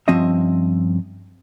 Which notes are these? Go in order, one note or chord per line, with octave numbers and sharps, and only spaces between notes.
G2 F3 C4 C#4 D#5 E5